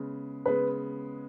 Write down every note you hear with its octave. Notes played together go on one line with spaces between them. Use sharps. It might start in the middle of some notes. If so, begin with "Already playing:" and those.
Already playing: C#3 G#3 B3
C#3 G#3 B3 B4